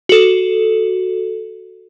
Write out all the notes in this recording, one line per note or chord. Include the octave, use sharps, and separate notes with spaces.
F#4 A4